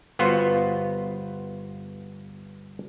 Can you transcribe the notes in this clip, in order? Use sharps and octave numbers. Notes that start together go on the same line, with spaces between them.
G1 B3 F4 F#4 C5